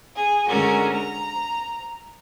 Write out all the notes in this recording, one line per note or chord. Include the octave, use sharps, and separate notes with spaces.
G#4
D3 G#3 C#4 F#4 A#4
A#5